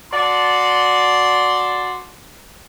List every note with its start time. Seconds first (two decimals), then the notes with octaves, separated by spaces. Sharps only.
0.11 F#4 D5 A5 C6